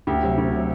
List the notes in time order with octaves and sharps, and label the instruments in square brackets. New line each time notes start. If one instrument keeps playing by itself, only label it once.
[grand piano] D2 G4
C3 F#3
D2
C3 F#3